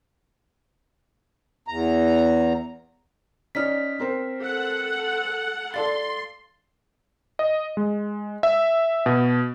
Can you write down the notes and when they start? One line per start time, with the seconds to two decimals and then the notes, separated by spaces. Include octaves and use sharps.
1.68 E2 A#5
3.55 C#4 D#4 D5 F6 B6
4.00 C4 A#4 C5
4.39 A4 F#5
5.74 A4 D5 F5 C6 A6
7.39 D#5
7.77 G#3
8.43 E5
9.06 B2